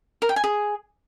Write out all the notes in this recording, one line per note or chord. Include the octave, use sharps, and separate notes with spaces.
A#4
G5
G#5
G#4